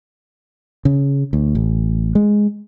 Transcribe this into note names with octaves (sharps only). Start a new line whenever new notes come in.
C#3
D2
A1
G#3